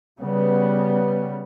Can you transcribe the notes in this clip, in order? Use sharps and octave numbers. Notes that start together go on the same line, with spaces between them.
C#3 G3 B3